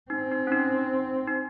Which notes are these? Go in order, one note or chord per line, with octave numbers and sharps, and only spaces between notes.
C4 D#4
D#4
C#4
D#4
D#4